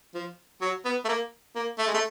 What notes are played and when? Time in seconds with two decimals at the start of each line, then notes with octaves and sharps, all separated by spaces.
0.15 F3
0.62 F#3
0.85 B3
1.05 A3
1.09 A#3
1.56 A#3
1.79 A3
1.88 G#3
1.94 A3